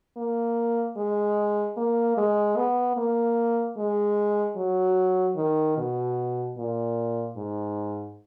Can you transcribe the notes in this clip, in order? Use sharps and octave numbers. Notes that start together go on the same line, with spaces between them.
A#3
G#3
A#3
G#3
B3
A#3
G#3
F#3
D#3
B2
A#2
G#2